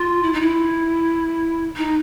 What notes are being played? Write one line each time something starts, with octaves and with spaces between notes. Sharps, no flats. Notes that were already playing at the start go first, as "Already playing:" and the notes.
Already playing: F4
E4
D#4
E4
D#4